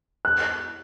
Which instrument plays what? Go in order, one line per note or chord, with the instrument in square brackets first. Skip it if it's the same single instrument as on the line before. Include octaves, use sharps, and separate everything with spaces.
[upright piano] F#6